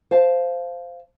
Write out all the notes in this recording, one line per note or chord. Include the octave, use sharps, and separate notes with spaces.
C5 F5 A5